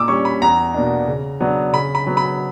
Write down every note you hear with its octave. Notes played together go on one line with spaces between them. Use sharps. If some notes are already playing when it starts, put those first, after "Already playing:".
Already playing: A#2 D6 E6
G3 C#4 C#6
B5
E2 A#5
B2 A#3 D4
C#3
F#3 B3 D4
C#3 B5
B5
F#3 B3
B5